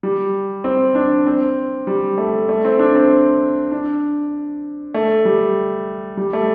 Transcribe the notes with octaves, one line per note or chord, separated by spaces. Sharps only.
G3
C4
D4
C4
G3
A3
A3
C4
D4
C4
D4
A3
G3
G3
A3